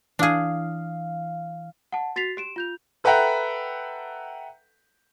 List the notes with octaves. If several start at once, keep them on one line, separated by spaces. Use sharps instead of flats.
E3 D4 G#4 F5
F#5 A5
F#4 A6 B6 C7 F7
G4 D7 E7
F4 G6 F7
A4 B4 E5 F#5 G5 A#5